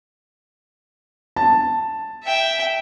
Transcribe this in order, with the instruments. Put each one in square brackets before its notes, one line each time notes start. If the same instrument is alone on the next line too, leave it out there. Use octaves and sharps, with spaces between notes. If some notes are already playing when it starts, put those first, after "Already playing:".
[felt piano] A5
[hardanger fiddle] E5 G5